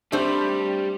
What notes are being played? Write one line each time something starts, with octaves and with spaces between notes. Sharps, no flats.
G3 A3 C4 D4